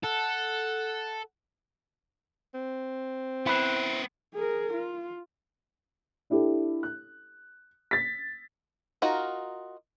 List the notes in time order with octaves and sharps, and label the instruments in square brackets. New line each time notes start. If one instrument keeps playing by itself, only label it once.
[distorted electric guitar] A4 [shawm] F#5
[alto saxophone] C4
[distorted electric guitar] B3 C5 [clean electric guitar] E4 B4
[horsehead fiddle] G#4 A#4
F4
[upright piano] D4 E4 G4 A4
F#6
A6 B6
[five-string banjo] D#4 F4 F#4 A#4